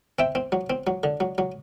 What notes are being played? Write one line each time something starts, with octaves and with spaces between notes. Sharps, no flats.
C4 E5 G5
C4
F#3
C4
F#3
D3
F#3
F#3